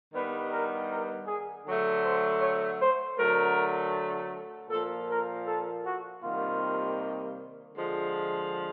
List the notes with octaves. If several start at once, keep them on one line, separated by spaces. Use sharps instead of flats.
G2 D#3 G3 B3 B4
A#4
A#4
G#4
D3 F#3 A3
C5
C#5
C5
D3 F#3 A3 A#4
A#2 F3 A#3 A4
A#4
A4
F#4
C3 D#3 G3 A#3 F4
D3 F3 G#3